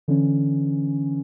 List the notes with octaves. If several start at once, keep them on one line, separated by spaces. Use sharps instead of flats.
D3 E3 C#4